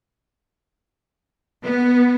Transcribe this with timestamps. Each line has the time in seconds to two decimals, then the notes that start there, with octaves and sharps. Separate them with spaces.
1.64 B3